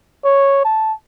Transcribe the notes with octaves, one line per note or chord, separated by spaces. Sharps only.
C#5
A5